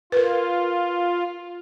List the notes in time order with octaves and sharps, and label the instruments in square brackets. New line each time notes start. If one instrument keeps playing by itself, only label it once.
[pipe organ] F4 [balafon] A#4 B4